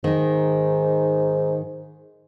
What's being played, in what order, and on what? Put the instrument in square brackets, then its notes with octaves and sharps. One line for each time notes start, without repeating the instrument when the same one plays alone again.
[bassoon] G#2 [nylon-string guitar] D#3 D#4